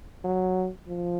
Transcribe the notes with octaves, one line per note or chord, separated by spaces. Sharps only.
F#3
F3